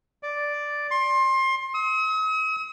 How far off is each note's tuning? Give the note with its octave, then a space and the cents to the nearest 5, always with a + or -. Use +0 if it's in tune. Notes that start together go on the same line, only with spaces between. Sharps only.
D5 +0
C6 +25
D#6 +45